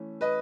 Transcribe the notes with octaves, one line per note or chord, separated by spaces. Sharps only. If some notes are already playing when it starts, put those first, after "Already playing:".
Already playing: E3 A3 C#4
B4 D#5